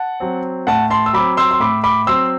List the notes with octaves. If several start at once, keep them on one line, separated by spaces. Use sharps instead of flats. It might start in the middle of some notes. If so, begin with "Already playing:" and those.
Already playing: F#5 A5
F#3 C4
A2 F#5 A5
A5 C6
E6
F#3 C4 B5 D6
C6 E6
C6
A2 B5 D6
B5 D6
F#3 C4 C6 E6